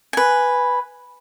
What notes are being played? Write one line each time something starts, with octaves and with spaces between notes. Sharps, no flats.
B4 G#5